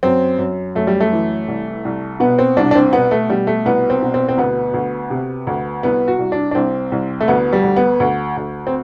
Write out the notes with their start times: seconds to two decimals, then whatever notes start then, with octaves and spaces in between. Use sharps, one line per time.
0.03 F#2 C4
0.38 F#2
0.75 F#2 A3
0.87 G3
1.00 A3
1.12 E3
1.48 C2
1.85 C2
2.20 B2 B3
2.39 C4
2.57 C2 D4
2.71 D4
2.75 C4
2.93 B2 B3
3.11 A3
3.30 B2 G3
3.47 A3
3.65 C2 B3
3.90 C4
4.02 B2
4.14 C4
4.29 C4
4.37 D2 B3
4.74 D2
5.10 C3
5.47 D2
5.83 C2 B3
6.08 F#4
6.19 C2
6.32 D4
6.51 D4
6.55 C2 C4
6.92 C2
7.20 A3
7.28 D2 B3
7.53 G3
7.64 D2
7.76 B3
8.00 D2
8.37 D2
8.67 C4